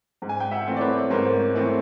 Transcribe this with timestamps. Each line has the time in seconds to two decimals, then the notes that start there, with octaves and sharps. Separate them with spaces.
0.22 G#2
0.29 G#5
0.40 G5
0.51 E5 F#5
0.67 E3 A3 C4
0.76 D5
0.81 B4 C#5
1.10 G#2 A#4 C5
1.55 E3 A3 C4